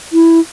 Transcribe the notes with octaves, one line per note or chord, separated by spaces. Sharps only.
E4